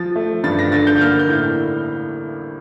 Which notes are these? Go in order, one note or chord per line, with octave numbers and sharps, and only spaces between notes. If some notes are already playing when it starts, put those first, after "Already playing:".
Already playing: F3 A6
A3
G2 A6
A#6
D3 A6
G6
A#3 F6
G6
A2